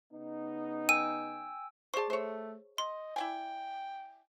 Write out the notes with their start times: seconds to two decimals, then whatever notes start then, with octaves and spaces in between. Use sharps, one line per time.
0.13 C#3 B3 D#4
0.89 G5 G#5 E6 D#7
1.94 G#4 C5 D5 A5 C#6
2.10 A3 C5 C#5
2.78 D#5 C6
3.16 E4 D5 G5 G#5